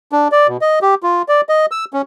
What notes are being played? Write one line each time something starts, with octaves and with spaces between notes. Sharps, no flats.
D4
D5
B2
D#5
G4
F4
D5
D#5
E6
C#4